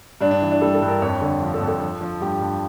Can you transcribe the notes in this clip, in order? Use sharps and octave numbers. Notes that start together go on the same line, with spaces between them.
G2 D4
D4
E3
D4
G3 A4
A4
G2
A#4
F2 C#5
D3
F3
A4
F2
A4
F3
F3
G2 G4
G2